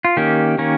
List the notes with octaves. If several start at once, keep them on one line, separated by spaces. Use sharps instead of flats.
F4
D#3 A#3 C#4 G4
D#3 A#3 C#4